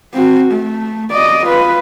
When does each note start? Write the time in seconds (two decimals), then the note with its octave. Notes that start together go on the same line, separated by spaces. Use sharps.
0.14 C4 F#4
0.52 A3
1.11 D5 D#5
1.47 F4 B4